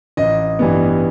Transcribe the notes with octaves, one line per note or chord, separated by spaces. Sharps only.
A1 D#5
G2 E3 G3 B3